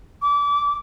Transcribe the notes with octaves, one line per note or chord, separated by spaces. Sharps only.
D6